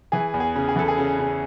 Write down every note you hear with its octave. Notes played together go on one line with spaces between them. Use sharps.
E3 G#4
E2
G#4
C#3
G#4
E3 A4
G#4
C#3
C#3